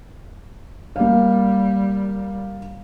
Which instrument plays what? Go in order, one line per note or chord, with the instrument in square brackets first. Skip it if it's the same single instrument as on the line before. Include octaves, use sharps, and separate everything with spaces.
[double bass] G3 [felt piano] A#3 F5